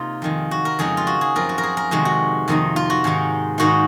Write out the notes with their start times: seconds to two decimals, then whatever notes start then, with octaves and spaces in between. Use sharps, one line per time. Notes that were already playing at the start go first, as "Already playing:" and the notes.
Already playing: C3 A#3 D#4 F4
0.22 F2 D#3 G#3
0.51 F#4
0.65 A#4
0.79 F2 C#3 G#3 D#4 G#4
0.97 F4
1.07 F#4
1.21 G#4
1.35 F#2 F3 C4 A#4
1.49 F#4
1.58 A#4
1.63 G#4
1.77 A#4
1.91 F2 C3 D#3 G#3 F#4
2.05 F#4
2.48 F2 C3 D#3 A#3 D#4
2.76 F4
2.90 F#4
3.04 G#2 D#3 G#3 D#4
3.58 G#2 D#3 A#3 D#4 F#4